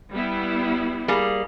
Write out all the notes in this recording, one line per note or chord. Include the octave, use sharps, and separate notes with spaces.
G3 B3 E4
G3 A#3 G#4